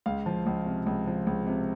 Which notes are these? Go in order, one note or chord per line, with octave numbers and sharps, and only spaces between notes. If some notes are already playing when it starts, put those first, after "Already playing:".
C#2 F5
F3
C#2
C3
C#2
F3
C#2
C3